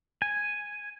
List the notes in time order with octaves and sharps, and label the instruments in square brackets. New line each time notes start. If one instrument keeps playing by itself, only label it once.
[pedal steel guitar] G#5